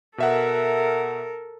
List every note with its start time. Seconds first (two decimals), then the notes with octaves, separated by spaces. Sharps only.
0.18 B2 A4 A#4 E5 F#5